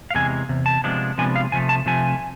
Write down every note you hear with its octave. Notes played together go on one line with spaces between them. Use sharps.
F5
E2 C3 E3 G#3 G#5
E2 C3
A5
C3 F3 G#3 B3 D4
C3 F3 G#3 B3 D4 G#5
F5
C3 F3 A3 G#5
A5
C3 F3 A3 G#5